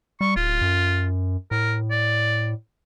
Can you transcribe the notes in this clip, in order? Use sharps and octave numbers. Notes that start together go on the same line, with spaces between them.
G3 C#6
D1 F4
F#2
A2 A#4
D5